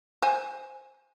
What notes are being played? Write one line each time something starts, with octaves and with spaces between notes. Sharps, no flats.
C5 G#5